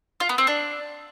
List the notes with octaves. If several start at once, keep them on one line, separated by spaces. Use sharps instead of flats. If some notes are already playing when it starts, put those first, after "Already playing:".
F4
B3
C4
D4